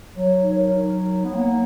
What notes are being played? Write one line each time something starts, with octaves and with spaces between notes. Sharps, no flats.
F#3 C#5
D#4
A#4
D#4
D#4
C#5
B3
A#3 F#5